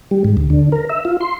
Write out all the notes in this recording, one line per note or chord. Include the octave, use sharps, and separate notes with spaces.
G3
G#2
D2
D3
A#4
E5
F4
C6